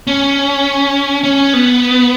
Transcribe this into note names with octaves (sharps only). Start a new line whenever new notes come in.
C#4
C#4
B3